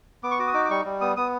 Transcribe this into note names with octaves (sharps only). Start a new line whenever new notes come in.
B3 D6
C#6
F#4 D6
D#6
D#4 D6
D6
G3 C#6
G3
B3 D#6
B3 D#6